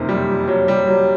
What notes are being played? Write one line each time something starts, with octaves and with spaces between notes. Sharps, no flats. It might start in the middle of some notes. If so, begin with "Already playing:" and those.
Already playing: F#1 F2 C3 D#3 A#3
G3
F#3
G3
F#3